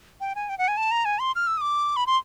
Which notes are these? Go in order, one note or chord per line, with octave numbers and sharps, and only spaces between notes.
G5
G#5
G5
F#5
G#5
A5
A#5
G#5
C6
F6
E6
D#6
D6
B5
C6